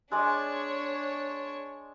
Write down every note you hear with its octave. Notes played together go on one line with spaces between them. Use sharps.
G#3 D4 C#5 D5